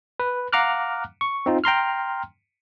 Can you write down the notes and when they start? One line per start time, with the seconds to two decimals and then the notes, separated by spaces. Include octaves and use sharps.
0.20 B4
0.53 F5 F#5 A#5 D6 F6 F#6
1.21 C#6
1.46 C4 D#4 F4
1.64 G5 A#5 C6 F6